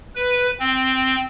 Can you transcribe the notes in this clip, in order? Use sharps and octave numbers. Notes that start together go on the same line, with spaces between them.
B4
C4